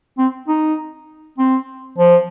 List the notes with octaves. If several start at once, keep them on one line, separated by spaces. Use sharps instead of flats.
C4
D#4
C4
F3